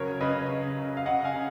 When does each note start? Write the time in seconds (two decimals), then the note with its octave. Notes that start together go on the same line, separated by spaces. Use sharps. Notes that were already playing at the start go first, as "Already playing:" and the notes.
Already playing: C#3 F#3 A#4 C#5
0.21 C#3 B4 D#5
0.50 C#3
0.78 C#3
0.97 F5
1.05 C#3 D#5 F#5
1.24 F5 G#5
1.34 C#3